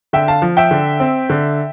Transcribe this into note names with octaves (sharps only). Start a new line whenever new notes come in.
D3 E5 G5
F5 A5
F3
E5 G5
D3
C4
D3